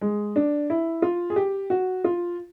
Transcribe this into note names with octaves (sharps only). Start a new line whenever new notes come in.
G#3
D4
E4
F4
G#4
G4
F#4
F4